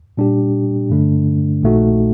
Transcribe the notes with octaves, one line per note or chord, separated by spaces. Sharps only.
A#2 G3 D4 G4
G2 D3 A3 D4
A#1 A#2 A3 D#4 F#4